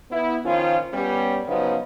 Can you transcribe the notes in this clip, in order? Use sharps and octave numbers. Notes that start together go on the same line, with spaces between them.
B3 E4
D#3 F3 C#4 F4
G3 B3 C#4
C#3 F3 F#3 G#3 B3 D#4